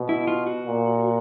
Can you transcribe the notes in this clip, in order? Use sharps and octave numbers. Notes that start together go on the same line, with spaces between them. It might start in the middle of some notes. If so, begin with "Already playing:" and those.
Already playing: B2
E4
F4
F#4
A#2